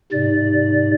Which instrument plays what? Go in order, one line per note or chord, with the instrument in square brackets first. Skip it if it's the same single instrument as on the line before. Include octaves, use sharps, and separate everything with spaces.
[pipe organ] G#2 C3 D5